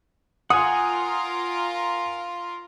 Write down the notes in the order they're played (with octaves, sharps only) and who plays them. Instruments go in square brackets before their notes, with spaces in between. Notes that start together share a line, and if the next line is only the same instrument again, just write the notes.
[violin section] F4 A#4 [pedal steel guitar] F#5 G#5 [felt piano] D#6